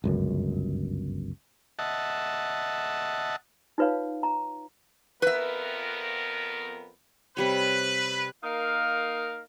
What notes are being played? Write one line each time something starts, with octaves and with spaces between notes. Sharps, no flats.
G1 C#2 F#2
D#5 E5 F#5 A5
D#4 F4 B4 C#5 F5
A#5
F2 B3 A#4 B4 E5
C3 G3 B4 C#5
A#3 D#4 A#4 F5